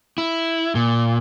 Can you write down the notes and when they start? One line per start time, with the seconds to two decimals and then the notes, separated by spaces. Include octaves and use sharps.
0.18 E4
0.75 A#2